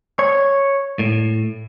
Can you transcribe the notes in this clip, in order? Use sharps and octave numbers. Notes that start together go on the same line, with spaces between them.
C#5
A2